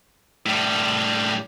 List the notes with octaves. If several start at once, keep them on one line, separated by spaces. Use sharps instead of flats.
A2 G3